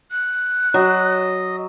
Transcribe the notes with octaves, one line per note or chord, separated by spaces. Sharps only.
F#6
F#3 D#5